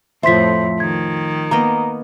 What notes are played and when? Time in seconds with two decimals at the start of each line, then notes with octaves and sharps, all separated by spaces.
0.23 F2 A2 F3 C5 E5 C6 B6
0.80 D#3 G#6
1.51 A#3 B3 D#5 A#5